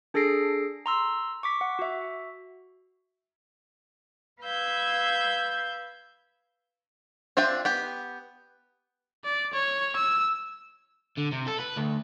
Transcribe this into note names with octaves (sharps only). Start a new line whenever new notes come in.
D4 G#4 A4 A#6 C7 D7
A#5 C6 E6
C#6 D6 B6
F#5
F#4 E5
B4 F5 B5 E6 G6 G#6
C4 D4 F4 E5 G5
B3 G4
D5
C#5
E6
D3
C3
A4
B4
D2